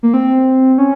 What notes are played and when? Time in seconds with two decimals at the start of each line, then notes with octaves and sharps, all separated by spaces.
0.03 A#3
0.14 C4
0.78 C#4